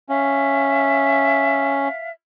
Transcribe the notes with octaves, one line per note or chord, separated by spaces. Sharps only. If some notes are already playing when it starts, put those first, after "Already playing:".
C#4 E5 F5